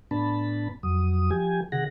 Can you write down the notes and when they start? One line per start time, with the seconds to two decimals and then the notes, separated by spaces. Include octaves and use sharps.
0.11 A2 B3 D4 A5 B5
0.83 F2 F#3 D#6
1.31 F3 G4 G#5
1.72 C3 D#3 G#4 F#5 A#6